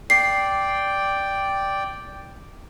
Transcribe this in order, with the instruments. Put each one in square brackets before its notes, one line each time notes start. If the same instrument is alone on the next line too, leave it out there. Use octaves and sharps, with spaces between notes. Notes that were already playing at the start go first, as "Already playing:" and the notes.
[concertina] D5 G5 [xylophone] C7